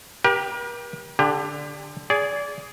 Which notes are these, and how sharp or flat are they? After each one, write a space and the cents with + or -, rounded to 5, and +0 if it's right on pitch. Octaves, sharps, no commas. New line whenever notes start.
G4 +5 A#4 +45
D3 +0 G4 +30
G#4 +0 D5 -25